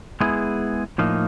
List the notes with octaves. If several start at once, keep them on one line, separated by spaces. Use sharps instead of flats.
G#3 B3 E4 G#4
A2 F3 A#3 D#4